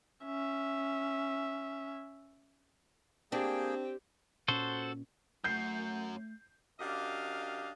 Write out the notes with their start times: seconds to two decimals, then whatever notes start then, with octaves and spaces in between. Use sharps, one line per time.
0.25 C#4 E5
3.32 A#3 C4 D4 G4 G#4 G5
4.48 A#2 C#4 F#4 A4 C5
5.44 F#2 F#3 A3 G6 C7
6.80 F#2 D4 G4 D#5 F5